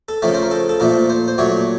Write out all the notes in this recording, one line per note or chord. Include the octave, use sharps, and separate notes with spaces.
A4
C#3 F3 A3 A#4
C5
A#4
A4
A4
A#2 F3 A3 A#4
C5
C5
A#2 F#3 A3 C#5